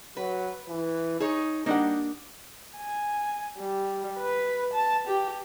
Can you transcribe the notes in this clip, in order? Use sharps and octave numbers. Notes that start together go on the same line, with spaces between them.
F#3 B4
E3
D#4 G#4 C#5
G3 A#3 D4 D#4 F#5
G#5
G3
B4
A5
G4